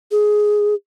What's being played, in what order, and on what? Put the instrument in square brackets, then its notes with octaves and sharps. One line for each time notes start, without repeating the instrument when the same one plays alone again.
[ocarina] G#4